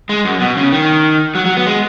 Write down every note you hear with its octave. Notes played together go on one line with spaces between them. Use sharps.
G#3
F#2
B2
C#3
D#3
F#3
F#3
B3
G#3